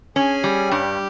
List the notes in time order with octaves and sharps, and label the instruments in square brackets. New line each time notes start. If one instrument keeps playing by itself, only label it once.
[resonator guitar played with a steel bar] C#4 [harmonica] G#4
[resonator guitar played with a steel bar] G3
[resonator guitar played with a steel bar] G2 [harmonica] G4